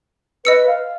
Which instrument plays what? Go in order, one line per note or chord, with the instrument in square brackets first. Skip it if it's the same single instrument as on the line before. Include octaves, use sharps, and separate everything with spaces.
[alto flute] B4 [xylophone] D#5 E6 C#7
[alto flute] F5